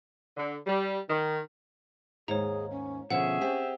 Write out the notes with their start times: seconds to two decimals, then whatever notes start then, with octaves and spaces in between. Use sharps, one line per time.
0.36 D3
0.66 G3
1.09 D#3
2.28 D#2 G#2 G#4 C#5 A#5
2.71 C#4
3.10 B2 D3 F3 C#4 G#4 E5 F#5
3.41 C4 G4